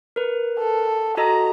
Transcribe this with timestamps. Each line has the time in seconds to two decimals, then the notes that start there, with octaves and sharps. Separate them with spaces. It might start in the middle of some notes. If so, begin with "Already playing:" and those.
0.16 A#4 B4
0.58 A4
1.17 F#4 A4 D#5 A#5